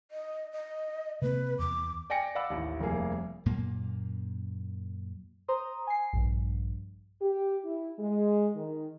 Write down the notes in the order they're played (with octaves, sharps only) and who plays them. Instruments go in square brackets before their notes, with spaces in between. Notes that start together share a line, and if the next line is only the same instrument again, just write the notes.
[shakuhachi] D#5
D#5
[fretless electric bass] C3 A#3 C4 [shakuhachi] B4
[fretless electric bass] E2 [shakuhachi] D6
[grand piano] D5 G5 G#5 A#6 C#7 D7
D5 F5 F#5 B5 D6 E6
A1 D#2
F1 G2 A#3 G#4
[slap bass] F#2 A#2 A#3
[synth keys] C5 A#5 C6 D#6
G#5 C7
A#1 G2
[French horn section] G4
E4
G#3
D#3